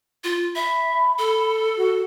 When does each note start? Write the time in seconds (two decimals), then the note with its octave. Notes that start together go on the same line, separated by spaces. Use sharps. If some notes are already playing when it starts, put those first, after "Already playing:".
0.24 F4
0.55 E5 B5
1.18 A4
1.77 F#4